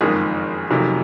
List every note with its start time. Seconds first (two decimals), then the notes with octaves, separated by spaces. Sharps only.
0.01 F#1 F2 D#3 G#3 G#4
0.71 F1 F2 C3 D#3 F#3